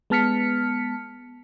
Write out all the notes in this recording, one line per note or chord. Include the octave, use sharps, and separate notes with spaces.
G#3 B3 A5 F6 B6 C#7